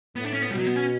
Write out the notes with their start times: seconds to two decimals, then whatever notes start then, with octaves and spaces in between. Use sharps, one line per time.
0.16 A2 B3
0.25 D4
0.33 C#4
0.42 B3
0.50 B2 G3
0.58 F#3
0.67 B3
0.76 C#4